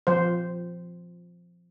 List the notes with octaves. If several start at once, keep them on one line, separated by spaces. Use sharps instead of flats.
F3 C5